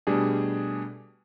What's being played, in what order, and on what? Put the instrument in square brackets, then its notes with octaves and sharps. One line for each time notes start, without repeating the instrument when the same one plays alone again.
[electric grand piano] B2 G3 A3 D4 G4 G#4